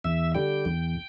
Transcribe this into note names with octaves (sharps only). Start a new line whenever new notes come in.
E2 E5
D3 G3 G5
E2